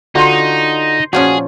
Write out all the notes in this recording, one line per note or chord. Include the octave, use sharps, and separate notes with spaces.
D3 D#4 F4 F#4 C5 C6
A#2 F3 C#4 F#4 G#4